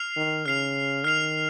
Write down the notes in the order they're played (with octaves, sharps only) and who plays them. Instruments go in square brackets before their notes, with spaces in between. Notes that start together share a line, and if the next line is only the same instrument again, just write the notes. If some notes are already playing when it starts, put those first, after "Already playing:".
Already playing: [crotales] F6 C7 F7
[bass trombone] D#3
[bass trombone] C#3 [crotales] F6 C7 F7
[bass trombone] D#3 [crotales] F6 C7 F7